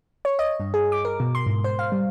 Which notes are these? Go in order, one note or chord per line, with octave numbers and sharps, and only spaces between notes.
C#5
D#5
G2
G#4
D6
A#4
B2
C6
G#2
C5
F5
G3